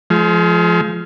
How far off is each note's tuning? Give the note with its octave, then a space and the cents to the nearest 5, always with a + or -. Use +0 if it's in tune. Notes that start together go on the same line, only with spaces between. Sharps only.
F3 -10 G#3 +35